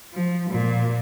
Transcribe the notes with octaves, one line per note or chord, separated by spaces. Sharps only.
F3
A#2